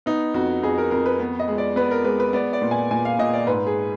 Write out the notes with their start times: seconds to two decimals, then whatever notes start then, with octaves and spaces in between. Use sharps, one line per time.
0.06 B3 D#4
0.34 F2 F#4
0.63 F2 G#4
0.78 A#4
0.91 F2 A#4
1.06 B4
1.20 B3
1.39 D#5
1.48 G#3
1.58 D5
1.76 B3 B4
1.91 A#4
2.05 G#3 B4
2.20 B4
2.33 B3 D5
2.53 D5
2.62 A#2
2.71 G#5
2.91 A#2 G#5
3.05 F5
3.19 A#2 D#5
3.33 D5
3.47 G#2 B4
3.67 G#4